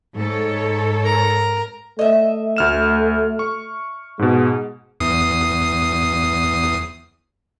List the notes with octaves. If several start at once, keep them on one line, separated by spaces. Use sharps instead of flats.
G#2 A4 C#5
A#4 A#5
A3 D#5 E5
D2 F6 E7
C#6
G#2 B2 G#3
E2 D#6 C7